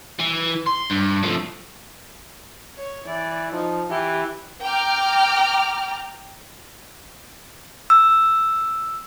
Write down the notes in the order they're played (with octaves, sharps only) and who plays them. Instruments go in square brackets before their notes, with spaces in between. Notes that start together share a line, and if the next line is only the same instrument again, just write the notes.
[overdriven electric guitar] E3
C6
G2
F3 A3
[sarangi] C#5
[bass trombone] E3 [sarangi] D5
[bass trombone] F3 [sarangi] D#4
[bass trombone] E3 [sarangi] G4
[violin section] G5 A#5 D6 F6
[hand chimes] E6